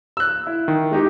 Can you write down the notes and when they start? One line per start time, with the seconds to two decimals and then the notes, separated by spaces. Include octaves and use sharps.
0.17 E6 F#6
0.47 E4
0.68 D#3
0.91 G#3 D#4 G4